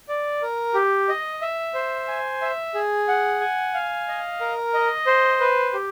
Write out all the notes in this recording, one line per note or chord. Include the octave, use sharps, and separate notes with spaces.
D5
A#4
G4
D#5
E5
C5
G#5
E5
G#4
F#5
G#5
F5
D#5
A#4
D#5
C5
B4
G4